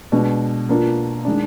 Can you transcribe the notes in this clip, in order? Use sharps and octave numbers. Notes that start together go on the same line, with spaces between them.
B2 G#3 D4
B2 A#3 D4 F4
D#3 G#3 D4